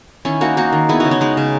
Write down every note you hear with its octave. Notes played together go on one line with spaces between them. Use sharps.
D#3 C#4 E4
A#3 D#4 F#4
A#3 D#4 F#4
D#3
B3 E4 G#4
C#3 D#4 F#4
C#4
G#3 D#4
C#3